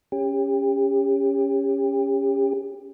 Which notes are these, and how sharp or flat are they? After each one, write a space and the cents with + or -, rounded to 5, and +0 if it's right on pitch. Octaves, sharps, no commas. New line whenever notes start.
C#4 +0 G4 +30